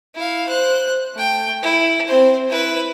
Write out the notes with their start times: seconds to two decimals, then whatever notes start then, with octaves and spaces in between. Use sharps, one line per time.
0.15 E4 F5
0.48 C5 F#6
1.14 A3 G5
1.63 E4
2.07 C4 C5
2.49 E4 B4